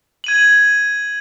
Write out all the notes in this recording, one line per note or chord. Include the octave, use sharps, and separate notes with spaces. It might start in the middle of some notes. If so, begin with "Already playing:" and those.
G#6 D#7 F#7